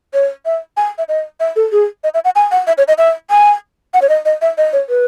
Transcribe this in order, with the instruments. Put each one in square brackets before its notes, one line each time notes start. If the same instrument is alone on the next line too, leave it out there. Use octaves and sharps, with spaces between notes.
[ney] C#5
E5
G#5
E5
D#5
E5
A4
G#4
D#5
E5
F#5
G#5
F#5
E5
C#5
D#5
E5
G#5
F#5
C#5
D#5
D#5
E5
D#5
C#5
B4